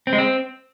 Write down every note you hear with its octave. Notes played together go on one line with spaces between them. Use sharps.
C4
G#3
C4